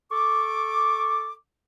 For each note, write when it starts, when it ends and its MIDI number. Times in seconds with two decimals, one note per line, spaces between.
0.11 1.33 69
0.11 1.33 85
0.11 1.33 86